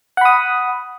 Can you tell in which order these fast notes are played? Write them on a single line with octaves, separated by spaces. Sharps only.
F#5 B5 D#6